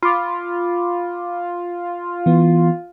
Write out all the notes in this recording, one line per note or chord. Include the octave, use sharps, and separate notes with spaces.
F4 B5 D6
E3 B3